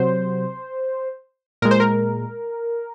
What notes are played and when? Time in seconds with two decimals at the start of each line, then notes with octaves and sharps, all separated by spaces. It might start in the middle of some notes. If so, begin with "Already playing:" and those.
Already playing: C3 F#3 C5
1.62 A#2 G#3 A#4
1.71 C5
1.80 A#4